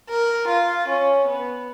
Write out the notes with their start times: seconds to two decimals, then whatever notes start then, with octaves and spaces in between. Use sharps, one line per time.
0.09 A#4
0.48 F4
0.88 C#4
1.27 B3